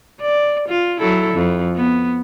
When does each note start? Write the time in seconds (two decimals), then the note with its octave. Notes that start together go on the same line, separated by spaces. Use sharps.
0.21 D5
0.69 F4
1.00 F#3 E4 A4
1.34 F2
1.76 B3